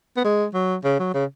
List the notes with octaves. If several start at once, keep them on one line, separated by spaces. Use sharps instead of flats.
B3
G#3
F#3
C#3
F#3
C#3